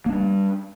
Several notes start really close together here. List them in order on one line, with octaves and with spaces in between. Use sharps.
A#3 D4 G3